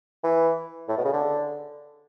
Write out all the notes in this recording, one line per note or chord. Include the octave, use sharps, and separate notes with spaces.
E3
A2
B2
C#3
D3